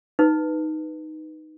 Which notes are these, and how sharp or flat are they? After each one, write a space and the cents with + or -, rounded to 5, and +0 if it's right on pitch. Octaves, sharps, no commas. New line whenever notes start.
D#4 +0 B4 +0